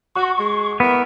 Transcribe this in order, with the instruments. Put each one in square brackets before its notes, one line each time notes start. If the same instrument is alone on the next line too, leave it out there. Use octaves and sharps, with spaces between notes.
[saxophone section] F#4 [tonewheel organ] C#6
[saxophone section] G#3
[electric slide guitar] B3 [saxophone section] E4 A#4